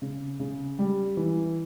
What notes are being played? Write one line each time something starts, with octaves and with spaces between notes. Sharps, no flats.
C#3
C#3
G3
E3